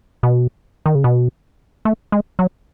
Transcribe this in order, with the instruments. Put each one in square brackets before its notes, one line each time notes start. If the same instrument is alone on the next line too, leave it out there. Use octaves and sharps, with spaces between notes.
[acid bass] B2
D#3
C#3
B2
A3
G#3
F#3